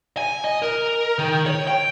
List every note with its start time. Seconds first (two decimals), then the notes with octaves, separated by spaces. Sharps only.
0.17 G#5
0.44 D#5
0.62 A#4
1.19 D#3
1.46 C#5
1.67 G5